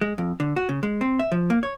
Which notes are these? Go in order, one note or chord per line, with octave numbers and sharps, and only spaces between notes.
G#3
F2
D3
F#4
C#3
G#3
C4
E5
F3
A#3
C#5